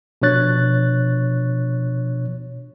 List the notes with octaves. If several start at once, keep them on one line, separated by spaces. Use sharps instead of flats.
B2 F3 D4 C#5 F#6 A6